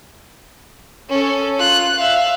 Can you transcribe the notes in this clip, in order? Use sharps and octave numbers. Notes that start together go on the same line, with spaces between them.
C#4 A4
F4 F#6
E5 F5